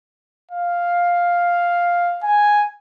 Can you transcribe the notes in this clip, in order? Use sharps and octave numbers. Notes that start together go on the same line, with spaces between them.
F5
G#5